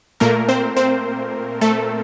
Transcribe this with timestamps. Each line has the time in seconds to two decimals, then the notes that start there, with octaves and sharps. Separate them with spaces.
0.20 A#2 A3 A#3 A#4
0.48 C4 C5
0.77 C4 C5
1.61 A3 A4